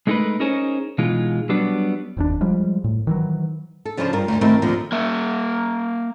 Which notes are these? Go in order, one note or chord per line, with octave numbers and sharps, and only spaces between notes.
G#3 A3 D#4 G#4 A#4 B4
C#4 D#4 G#4 A#4 C5 C#5
B2 E3 G#3 D#4 F4
F#3 G3 B3 D4
F1 D#2 D4
F3 G3 G#3
A2
D#3 E3 F#3
A4
C#3 F3 C#4 D4 F4 C5
G2 F4 A#4
D2
D#3 A3 C4 E4 G4 A#4
D#2 A#2 D3 F3
A#3 E5